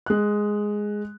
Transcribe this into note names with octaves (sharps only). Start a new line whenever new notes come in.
G#3 F#6